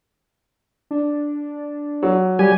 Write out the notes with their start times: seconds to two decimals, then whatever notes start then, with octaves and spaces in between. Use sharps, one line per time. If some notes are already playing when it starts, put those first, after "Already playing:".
0.91 D4
2.03 F#3
2.39 G3 G4 G#5